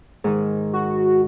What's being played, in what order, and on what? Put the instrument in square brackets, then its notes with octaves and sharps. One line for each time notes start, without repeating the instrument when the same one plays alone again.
[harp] G#2 D#3
[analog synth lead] F#4